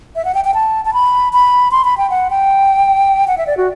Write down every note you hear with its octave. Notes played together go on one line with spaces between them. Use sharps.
E5
F#5
G5
G5
A5
A5
B5
B5
C6
B5
G5
F#5
G5
F#5
E5
D5
F#4